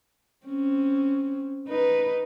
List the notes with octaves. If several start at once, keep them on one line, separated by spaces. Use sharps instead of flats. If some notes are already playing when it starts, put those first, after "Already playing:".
C4 C#4
D#4 B4